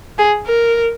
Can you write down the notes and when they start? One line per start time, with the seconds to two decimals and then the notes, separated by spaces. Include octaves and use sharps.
0.18 G#4
0.46 A#4